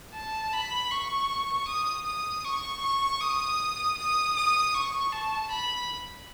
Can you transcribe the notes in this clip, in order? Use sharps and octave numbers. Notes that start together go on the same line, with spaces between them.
A5
B5
C#6
D#6
D#6
C#6
C#6
D#6
D#6
D#6
C#6
A5
B5